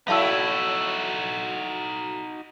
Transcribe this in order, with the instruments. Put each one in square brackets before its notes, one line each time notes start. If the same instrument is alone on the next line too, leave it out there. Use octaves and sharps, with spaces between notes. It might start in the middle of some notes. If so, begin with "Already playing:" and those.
[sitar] F#3 A3 E4 [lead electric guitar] D#4 F#4 [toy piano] F5 A5 E6